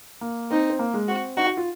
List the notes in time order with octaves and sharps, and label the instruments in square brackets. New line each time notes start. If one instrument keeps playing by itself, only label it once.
[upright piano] A#3
[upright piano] C4 [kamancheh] D#4
[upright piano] C4
A#3
G#3
[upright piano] C4 [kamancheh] F#4
[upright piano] D#4 [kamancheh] F#4
[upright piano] F#4
F4